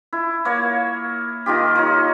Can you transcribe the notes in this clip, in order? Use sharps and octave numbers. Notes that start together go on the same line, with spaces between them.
E4
A#3 C#5
D#3 D#4 F4 G4
D#4 F4 C#5